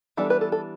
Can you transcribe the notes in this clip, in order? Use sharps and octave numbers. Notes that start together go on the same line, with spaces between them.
E3 G3 B3 D4 A4
B4
A4
A4